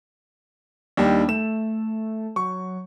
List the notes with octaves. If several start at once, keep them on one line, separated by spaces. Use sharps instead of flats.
D#2 G3 D4
A3 E7
F#3 C#6